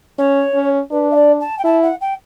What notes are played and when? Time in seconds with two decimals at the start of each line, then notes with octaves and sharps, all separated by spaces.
0.18 C#4 C#5
0.54 C#4
0.91 D4 B4
1.11 E5
1.15 D5
1.40 A5
1.58 G5
1.64 E4 A5
1.82 F#5
2.01 G5